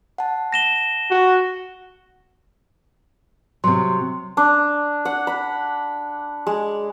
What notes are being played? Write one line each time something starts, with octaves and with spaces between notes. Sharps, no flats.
F#5 A5
A#6 E7 G7
F#4
C3 F#3 C6
D4
F#5
B5
G#3